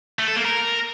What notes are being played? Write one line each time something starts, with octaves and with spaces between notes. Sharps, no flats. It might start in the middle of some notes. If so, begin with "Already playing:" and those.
A3
A4
A#3
A#4